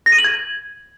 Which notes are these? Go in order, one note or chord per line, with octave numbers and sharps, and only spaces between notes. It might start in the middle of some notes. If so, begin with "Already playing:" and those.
A#6
D#7
F#7
G#6